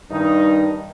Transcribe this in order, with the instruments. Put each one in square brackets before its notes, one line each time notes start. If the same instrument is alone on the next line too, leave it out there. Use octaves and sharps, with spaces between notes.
[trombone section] G2 D#3 D#4